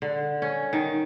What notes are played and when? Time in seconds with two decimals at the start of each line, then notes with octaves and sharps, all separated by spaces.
0.02 D3
0.42 C#4
0.73 D#3